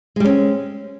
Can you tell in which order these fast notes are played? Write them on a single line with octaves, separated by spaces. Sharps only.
G#3 G3 C#4 C4